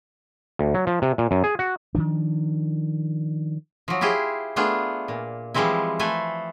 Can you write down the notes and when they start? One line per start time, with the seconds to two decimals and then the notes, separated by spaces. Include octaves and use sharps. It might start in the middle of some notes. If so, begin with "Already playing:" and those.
0.59 D2
0.74 F#3
0.87 F3
1.02 C3
1.18 A#2
1.31 F#2
1.44 G#4
1.59 F#4
1.95 D#3 F3 D4
3.88 F3 F#3
4.01 E4 F4 G4 G#4 C5
4.56 A3 B3 D4 F4 G#4
5.08 A#2
5.54 E3 F3 G3 G#3 C4 E4
5.99 A3 A4 B4 C5 G#5